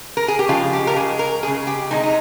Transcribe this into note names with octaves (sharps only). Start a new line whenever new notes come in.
A#4
G#4
G4
C#3 F3 G#3 F4
G4
A#4
C#3 G#3 G#4
A#4
C#3 G#3 G#4
G4
C3 F3 G#3 D#4
D#4